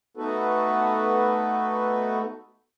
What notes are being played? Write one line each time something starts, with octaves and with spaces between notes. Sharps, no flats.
A3 B3 D#4 F#4 A4 B4